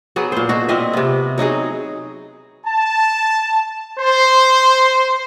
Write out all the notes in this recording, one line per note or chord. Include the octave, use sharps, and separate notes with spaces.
F#3 B3 G#4
A#2 C5
B2 F#4
A#2 C4 D#5 E5
C3 B3
F#3 D#4 F#4 G#4
A5
C5